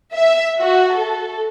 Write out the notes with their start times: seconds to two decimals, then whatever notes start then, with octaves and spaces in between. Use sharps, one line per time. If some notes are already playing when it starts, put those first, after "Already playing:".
0.15 E5
0.61 F#4
0.96 A4